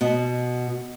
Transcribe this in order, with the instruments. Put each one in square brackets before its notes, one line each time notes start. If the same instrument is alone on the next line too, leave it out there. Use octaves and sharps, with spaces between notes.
[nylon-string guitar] B2